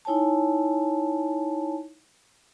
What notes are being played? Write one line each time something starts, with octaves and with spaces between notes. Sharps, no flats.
D#4 E4 C#5 G#5 A5